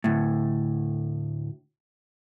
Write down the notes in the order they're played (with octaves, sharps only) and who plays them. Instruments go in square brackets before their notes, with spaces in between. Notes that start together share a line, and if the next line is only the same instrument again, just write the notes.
[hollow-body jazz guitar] D2 A2